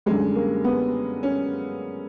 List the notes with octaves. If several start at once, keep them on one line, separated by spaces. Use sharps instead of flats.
F#2 D3 G3 G#3
A#3
B3
C#4